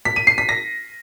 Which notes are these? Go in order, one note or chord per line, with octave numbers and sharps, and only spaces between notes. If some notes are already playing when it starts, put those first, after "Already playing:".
B6
D#7
C7
B6
A#6